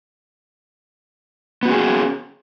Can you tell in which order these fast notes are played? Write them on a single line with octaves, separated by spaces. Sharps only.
B3 F#4 C#4 G#4